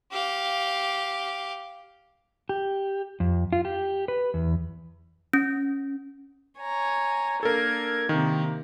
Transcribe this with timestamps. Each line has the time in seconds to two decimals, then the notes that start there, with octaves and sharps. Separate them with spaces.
0.12 G4 F5
2.49 G4
3.20 F2
3.53 F4
3.65 G4
4.08 B4
4.34 E2
5.33 C#4
6.59 C#5 G#5 A#5
7.43 A#3 D4 A4 A#4 G#6
8.09 C3 D#3 A#3